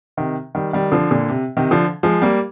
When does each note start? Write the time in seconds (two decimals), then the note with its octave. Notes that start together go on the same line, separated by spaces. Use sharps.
0.17 C3 D#3
0.55 D#3 G3
0.73 D#3 G3
0.92 D3 F3
1.11 A#2 D3
1.29 C3
1.57 C3 D#3
1.71 D3 F3
2.03 F3 G#3
2.22 G3 A#3